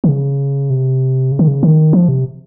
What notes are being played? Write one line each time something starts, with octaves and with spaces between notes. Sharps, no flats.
D#3
C#3
C3
C#3
D#3
C#3
D#3
F3
C3